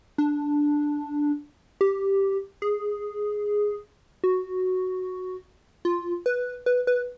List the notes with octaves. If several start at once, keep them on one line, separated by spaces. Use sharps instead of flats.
D4
G4
G#4
F#4
F4
B4
B4
B4